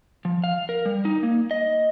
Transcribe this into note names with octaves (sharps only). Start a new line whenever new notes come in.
F3
F5
A#4
G3
D#4
A#3
D#5